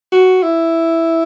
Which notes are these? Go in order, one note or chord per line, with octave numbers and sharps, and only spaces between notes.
F#4
E4